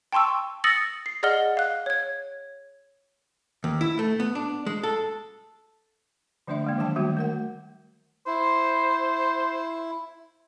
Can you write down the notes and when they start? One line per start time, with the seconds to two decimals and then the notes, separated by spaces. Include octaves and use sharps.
0.12 G5 A5 C6 C#6 E6
0.64 D#6 E6 A6 A#6 C#7 F#7
1.06 C7
1.23 G#4 D5 D#5 F#5 F6 G7
1.57 F5 F#6
1.86 C#5 G#6
3.64 D#2
3.81 E4
3.99 A3
4.20 B3
4.35 D4
4.66 G#3
4.83 A4
6.47 D3 F3 A3 D4 D5 E5
6.64 F3 G#3 A#3
6.78 D#3 F3 F#3 D4 G5 A5
6.96 D#3 G3 A3 A#3 F#4
7.17 A3 A#4 F#5
8.27 E4 C5